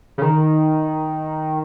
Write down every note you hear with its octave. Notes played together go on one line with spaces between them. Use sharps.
C#3
D#3